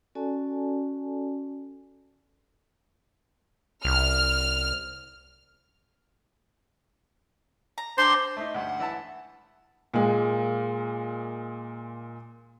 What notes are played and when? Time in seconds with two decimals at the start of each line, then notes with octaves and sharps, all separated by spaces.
0.15 C#4 F#4 A4 D5 G#5 A5
3.85 C2 F6
7.78 A#5
7.98 D4 G4 C5 A#5 C6
8.37 A3 D#4
8.54 D2 G2 F#5
8.80 E3 E5 A5
9.94 A#2 G#3